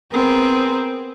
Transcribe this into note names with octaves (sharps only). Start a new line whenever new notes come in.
B3 C4 G#4 A#4